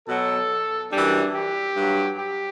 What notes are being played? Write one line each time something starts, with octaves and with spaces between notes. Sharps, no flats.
B2 F#3 A4
F#2 E3 G3 D4
G4
G2 F#3
G4